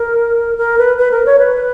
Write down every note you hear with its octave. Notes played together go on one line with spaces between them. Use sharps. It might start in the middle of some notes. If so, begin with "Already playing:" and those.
Already playing: A#4
A#4
B4
B4
A#4
C#5
B4